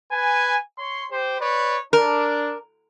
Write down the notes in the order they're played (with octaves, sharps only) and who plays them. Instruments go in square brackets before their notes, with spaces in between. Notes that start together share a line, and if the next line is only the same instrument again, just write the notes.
[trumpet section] B4 G#5
C#5 C6
G4 C5
B4 C#5 D5
[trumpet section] D4 [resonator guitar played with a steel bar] A#4